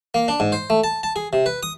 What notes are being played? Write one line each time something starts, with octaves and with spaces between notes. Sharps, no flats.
A#3
D4
G#2
C5
A3
A5
A5
G#4
C3
B4
D#6